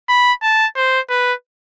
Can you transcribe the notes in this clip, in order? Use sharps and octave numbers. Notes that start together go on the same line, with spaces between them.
B5
A5
C5
B4